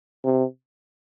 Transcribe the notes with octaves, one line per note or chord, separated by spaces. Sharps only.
C3